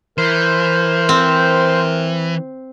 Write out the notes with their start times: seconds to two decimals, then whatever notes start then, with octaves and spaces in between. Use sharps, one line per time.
0.18 E3 A#4 C5
1.09 C4